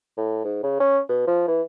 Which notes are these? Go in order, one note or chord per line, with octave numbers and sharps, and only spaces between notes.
A2
G#2
C#3
C#4
B2
F3
E3